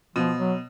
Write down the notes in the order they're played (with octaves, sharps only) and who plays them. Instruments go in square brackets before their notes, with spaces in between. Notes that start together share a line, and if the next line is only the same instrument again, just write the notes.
[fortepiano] B2 [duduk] F3
[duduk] F#3